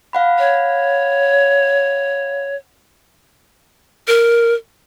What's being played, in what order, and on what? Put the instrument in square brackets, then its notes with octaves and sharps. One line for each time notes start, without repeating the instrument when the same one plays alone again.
[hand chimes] F5 F#5 B5
[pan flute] C#5
A#4